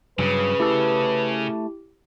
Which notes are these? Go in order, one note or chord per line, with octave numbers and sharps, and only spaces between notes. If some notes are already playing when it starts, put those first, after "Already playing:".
G2 C#3 F#3 B4
A3 E4 G4 A4